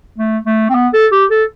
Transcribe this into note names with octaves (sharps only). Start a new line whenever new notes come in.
A3
A3
C4
B3
A4
G4
A4